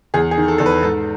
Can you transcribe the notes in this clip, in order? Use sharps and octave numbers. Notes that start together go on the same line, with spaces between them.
E2 G#4
G#4
D#3
A4
E2 A4
B4
G#2 A4